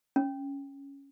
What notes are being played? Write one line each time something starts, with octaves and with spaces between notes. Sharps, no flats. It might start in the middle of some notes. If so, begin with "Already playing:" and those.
C#4